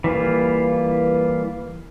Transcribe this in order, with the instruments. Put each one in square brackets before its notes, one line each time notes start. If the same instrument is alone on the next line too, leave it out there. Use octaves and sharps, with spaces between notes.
[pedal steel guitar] E3 G3 A#3 F4